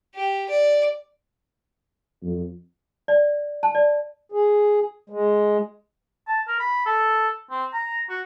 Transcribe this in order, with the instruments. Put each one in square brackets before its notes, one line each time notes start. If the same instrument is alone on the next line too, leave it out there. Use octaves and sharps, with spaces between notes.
[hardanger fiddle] G4
D5
[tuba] F2
[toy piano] D5
A5
D5
[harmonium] G#4
G#3
[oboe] A5
A#4
B5
A4
C4
A#5
F#4